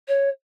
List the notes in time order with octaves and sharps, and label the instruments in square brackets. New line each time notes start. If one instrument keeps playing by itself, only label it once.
[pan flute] C#5